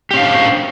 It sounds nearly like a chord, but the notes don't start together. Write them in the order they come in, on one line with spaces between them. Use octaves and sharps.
G4 C#4 F5 D4 C5